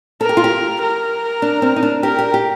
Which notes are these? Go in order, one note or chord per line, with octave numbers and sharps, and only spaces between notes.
A4 A#4
G4
F4
G4
A#4
D4
C4
D#4
D4
G4 A#4
G4
G4